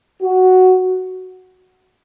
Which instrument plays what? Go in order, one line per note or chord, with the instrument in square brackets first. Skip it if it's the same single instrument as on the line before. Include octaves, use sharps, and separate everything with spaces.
[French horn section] F#4